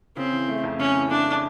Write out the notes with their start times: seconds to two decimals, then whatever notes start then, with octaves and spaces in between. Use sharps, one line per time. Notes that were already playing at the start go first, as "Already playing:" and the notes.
0.17 C#3 C4
0.32 E3
0.48 A3
0.64 F2
0.79 C#3 C#4
0.95 E3
1.10 A3 D4